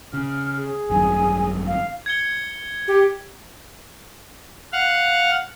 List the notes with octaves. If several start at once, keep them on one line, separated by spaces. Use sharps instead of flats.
C#3 F6
G#4
G#1 F#2 D#3 G#5
F5
G#6 C#7 G7
G4
F5 F#5